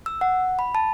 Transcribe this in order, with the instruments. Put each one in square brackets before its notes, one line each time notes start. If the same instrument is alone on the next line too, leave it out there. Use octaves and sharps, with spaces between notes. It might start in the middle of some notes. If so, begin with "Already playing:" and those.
[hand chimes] E6
F#5
B5
A5